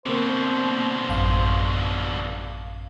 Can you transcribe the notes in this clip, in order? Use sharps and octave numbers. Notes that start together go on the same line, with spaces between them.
B2 D3 A#3 C4 C5
A1 F#2 F5